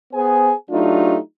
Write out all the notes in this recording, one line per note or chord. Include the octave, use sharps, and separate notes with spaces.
B3 G#4 C5 G#5
F#3 A3 D4 D#4 F4 G4